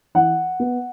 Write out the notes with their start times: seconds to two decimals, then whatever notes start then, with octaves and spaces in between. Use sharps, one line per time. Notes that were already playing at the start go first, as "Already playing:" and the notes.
0.15 E3 F#5
0.60 B3